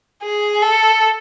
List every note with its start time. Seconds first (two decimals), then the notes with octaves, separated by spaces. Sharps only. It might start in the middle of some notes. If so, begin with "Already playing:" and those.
0.23 G#4
0.62 A4